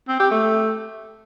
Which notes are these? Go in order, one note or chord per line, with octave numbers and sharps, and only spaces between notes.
C4
G4
A3